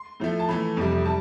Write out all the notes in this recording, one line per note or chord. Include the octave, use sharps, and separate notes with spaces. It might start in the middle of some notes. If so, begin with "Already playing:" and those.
Already playing: C6
A2 F3 A3
A5
A2 E3 A3 B5
F2 C3 G3
G3 A5